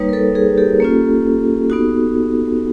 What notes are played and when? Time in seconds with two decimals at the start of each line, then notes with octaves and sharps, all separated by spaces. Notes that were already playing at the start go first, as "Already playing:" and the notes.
Already playing: G3 A#3 D#4 B4 C#5
0.09 A#4
0.13 A4 B4
0.35 G#4 A#4
0.57 G4 A4
0.80 A#3 C#4 F4
1.70 B3 D#4 F#4